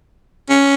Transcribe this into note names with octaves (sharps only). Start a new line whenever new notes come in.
C#4